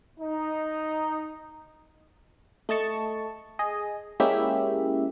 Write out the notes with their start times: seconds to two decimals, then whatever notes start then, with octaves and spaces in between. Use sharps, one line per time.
0.19 D#4
2.69 A3 D#5 A5 C#6
3.59 G#4 D#5
4.20 G#3 A#3 C#4 E4 G4 E5